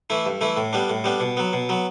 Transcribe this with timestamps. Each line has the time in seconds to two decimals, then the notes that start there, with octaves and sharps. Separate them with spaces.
0.10 E3 A3 E4
0.26 G2
0.41 E3 A3 E4
0.57 A2
0.73 G3 B3 D4
0.90 A2
1.04 G3 B3 D4
1.20 B2
1.37 F#3 B3
1.53 B2
1.69 F#3 B3